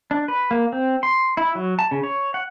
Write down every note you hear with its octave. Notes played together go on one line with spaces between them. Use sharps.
D4
B4
A#3
C4
C6
E4
F#3
A5
C#3
C#5
F#5